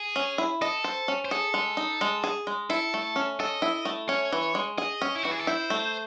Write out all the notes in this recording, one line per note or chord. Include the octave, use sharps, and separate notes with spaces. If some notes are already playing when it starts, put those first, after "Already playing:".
Already playing: G#4
C#4
E4
A4 D#5
C5
C#4
C5
G#4 A4
G#3
D#4
G#3
G#4
G#3
E4 A4
A3
C#4
A4 D#5
E4
A3
C#4 C#5
E3
G#3
G#4 D#5
C#4
E4
E3 F#4
G#4
A4
E4 C5
A3